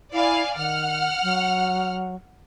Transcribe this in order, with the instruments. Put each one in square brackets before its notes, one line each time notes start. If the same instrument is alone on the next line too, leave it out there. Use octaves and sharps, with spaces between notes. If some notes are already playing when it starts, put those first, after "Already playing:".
[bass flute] E4 [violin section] D5 F5 G#5
[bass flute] D#3 [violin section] F#5 F6
[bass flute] F#3